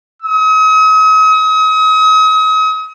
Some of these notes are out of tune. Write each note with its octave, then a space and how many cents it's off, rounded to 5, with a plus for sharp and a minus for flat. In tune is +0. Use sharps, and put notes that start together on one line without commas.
D#6 +40